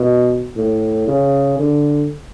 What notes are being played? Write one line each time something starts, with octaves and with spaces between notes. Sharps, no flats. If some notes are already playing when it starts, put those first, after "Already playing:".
Already playing: B2
A2
C#3
D3